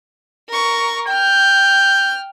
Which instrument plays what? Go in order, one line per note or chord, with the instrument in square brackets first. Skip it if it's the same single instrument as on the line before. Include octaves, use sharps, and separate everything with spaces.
[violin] A#4 C#6
[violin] G5 F6 [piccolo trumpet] G6